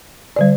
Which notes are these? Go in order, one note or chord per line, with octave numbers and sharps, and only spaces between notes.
D3 G3 D5